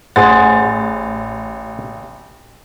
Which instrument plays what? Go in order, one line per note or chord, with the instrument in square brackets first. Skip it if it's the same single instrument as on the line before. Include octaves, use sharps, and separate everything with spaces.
[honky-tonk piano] A1 A6 [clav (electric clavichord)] G#4 C5 F#5